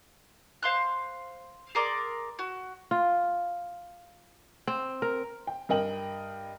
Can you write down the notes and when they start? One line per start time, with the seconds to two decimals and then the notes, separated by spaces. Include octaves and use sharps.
0.63 C5 F5 C6 F#6
1.75 G#4 A#4 D5 C6
2.39 F#4
2.91 F4
4.67 C4
5.02 A#4
5.47 G5
5.69 G2 A#4 D#5 G5 F#7